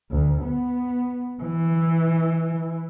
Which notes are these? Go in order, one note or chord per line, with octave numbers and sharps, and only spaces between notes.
D2
B3
E3